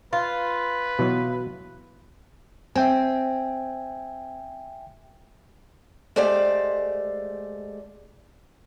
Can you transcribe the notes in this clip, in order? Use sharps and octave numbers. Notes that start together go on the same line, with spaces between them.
F4 B4
B2 E3 F#3
C4 E5 G5 G#5
G#3 A3 G4 C5 D5 F5